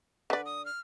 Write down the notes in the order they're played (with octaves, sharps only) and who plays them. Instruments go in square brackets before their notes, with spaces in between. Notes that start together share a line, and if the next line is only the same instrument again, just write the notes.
[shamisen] D3 D5 [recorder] B4
[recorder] D#6
F6